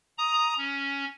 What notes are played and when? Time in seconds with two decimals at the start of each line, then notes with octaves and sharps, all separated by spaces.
0.18 A#5 D#6
0.58 C#4